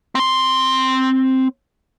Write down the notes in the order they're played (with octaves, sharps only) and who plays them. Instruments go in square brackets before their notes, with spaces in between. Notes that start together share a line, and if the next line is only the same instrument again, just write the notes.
[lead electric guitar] C4 C6